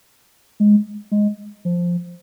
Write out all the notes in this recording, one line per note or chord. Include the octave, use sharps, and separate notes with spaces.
G#3
G#3
F3